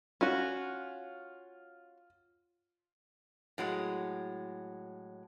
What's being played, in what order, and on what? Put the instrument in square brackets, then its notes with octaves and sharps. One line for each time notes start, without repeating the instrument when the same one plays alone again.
[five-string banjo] C#4 F#4 [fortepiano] F4
[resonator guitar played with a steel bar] A2 F#3 G#3